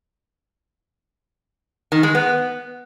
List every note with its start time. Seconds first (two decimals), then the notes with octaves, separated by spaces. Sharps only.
1.92 D#3
2.03 G#3
2.15 B3